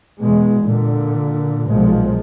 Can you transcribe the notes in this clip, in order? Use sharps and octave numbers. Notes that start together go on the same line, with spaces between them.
E2 B2 G#3
A#2 D3
B1 A#2 F3 G#3